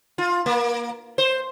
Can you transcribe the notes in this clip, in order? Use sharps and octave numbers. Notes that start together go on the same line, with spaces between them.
F4
A#3
C5